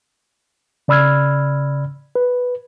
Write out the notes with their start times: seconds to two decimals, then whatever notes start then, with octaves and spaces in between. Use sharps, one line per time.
0.88 C#3 D5 B5 E6 F6 G#6
2.15 B4